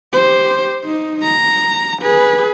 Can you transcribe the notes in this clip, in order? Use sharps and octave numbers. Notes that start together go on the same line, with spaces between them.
G4 C5
D#4
A#5
G#4 B4